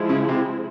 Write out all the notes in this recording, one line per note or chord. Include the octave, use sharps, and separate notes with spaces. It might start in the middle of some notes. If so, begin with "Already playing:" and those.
Already playing: F3 G#3 E4 G#4
C#3
C3